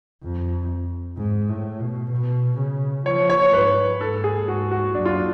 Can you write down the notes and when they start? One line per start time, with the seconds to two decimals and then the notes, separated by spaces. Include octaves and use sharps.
0.23 F2
1.17 G#2
1.49 A2
1.80 B2
2.12 B2
2.59 C#3
3.06 F3 C#5
3.30 C#5
3.53 G#2 B4
4.01 G#2 A4
4.24 G#4
4.47 G#2 F#4
4.71 F#4
4.95 F#2 D4
5.05 F4
5.16 D4